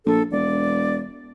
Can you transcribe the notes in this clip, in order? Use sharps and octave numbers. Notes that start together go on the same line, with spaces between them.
A#1 A4
E1 D5